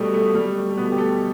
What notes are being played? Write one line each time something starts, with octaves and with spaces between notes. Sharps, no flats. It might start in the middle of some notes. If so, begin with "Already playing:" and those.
Already playing: B2 G3 A3 B3
A3
G3
A3
A3
B2 B3
G4
A3 A4